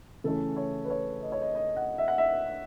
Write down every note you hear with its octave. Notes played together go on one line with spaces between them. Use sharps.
C#3 E3 A3 C#4 A4
C#5
B4
C#5
D#5
C#5
D#5
D#5
F#5
E5
F#5
E5